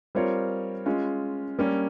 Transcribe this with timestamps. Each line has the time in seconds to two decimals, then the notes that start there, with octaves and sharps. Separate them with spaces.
0.15 G3 C4 F4 A#4 C#5
0.86 G#3 C#4 F4
1.59 G3 A#3 C#4